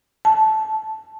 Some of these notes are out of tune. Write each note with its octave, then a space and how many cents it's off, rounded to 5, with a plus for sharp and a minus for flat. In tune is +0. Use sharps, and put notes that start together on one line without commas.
A5 -15